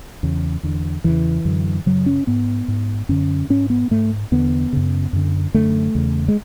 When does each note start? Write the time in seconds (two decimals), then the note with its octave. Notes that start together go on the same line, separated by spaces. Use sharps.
0.23 E2 C#3
0.63 E2 D3
1.04 E2 C#3 E3
1.45 F#2 D3
1.86 F#2 C#3 F#3
2.06 C#4
2.27 G#2 B3
2.68 G#2
3.09 F#2 D3 C#4
3.50 G#2 C#4
3.70 B3
3.91 G#2 A3
4.32 E2 D3 B3
4.73 F#2 C#3
5.13 F#2 D3
5.54 F#2 D3 A3
5.95 E2 C#3
6.28 G#3